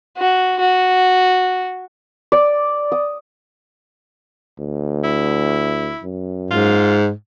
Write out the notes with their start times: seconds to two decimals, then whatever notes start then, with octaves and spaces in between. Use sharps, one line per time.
0.18 F#4
0.59 F#4
2.32 D5
2.92 D#6
4.59 D2
5.04 E4
6.03 F#2
6.51 G#2 F4